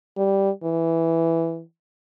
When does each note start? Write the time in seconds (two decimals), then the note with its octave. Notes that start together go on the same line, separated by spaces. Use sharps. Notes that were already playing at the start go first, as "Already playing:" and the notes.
0.17 G3
0.64 E3